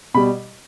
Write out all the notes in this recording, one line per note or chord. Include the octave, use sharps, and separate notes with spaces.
B2 G3 B5